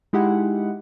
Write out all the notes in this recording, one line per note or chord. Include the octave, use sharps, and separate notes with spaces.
G#3 D#4 E4 G4 F#5